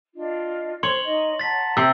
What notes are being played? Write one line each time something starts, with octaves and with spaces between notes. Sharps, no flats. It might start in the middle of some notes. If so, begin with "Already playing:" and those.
D4 F4 D#5
C5 C#5 C6 F#7
D#4 D#5
F#5 A5 A#5 A6 B6
C3 E6